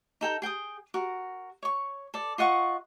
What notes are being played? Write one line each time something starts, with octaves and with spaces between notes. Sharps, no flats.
D#4 A4 G5 A#5
G#4 G5 G#5 D#6
F#4 A#4
C#5 C#6
A4 D5
F4 D#5 F#5 C#6